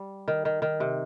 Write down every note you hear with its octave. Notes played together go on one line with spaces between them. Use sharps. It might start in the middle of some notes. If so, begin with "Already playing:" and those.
Already playing: G3
D#3
D#3
D#3
C3